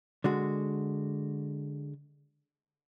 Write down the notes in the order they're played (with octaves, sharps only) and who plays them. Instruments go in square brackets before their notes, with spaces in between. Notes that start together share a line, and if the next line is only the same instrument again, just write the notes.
[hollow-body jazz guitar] D3 G#3 F#4